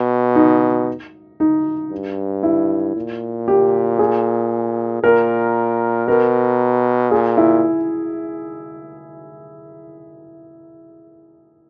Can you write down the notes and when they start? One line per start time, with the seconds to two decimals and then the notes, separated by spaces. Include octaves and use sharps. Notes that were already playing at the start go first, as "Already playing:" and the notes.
Already playing: B2
0.35 D#4
1.40 D#4
1.91 G2
2.43 E4
2.96 A#2
3.48 G4
3.99 G#4
5.04 A#2 A#4
6.08 B2 A#4
7.11 A#2 G#4
7.37 E4